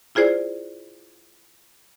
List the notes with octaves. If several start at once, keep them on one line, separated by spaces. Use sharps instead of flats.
E4 F4 G#4 C5 D5